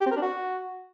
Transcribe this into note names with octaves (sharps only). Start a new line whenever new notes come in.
G4
C4
A#4
D4
F#4